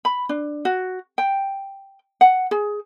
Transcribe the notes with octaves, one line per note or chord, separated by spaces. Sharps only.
B5
D4
F#4
G5
F#5
G#4